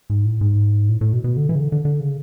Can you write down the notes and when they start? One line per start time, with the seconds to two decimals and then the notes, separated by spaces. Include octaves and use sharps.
0.10 G#2
0.25 A2
0.41 G#2
0.89 A2
1.01 A2
1.13 B2
1.24 B2
1.37 D3
1.49 E3
1.55 C#3
1.60 D3
1.72 D3
1.85 D3
2.00 C#3